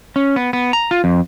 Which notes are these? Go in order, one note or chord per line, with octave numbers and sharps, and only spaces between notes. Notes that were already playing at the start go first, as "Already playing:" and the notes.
C#4
B3
B3
A#5
F4
F2